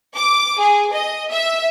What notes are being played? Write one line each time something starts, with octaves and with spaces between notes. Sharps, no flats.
D6
G#4
D#5
E5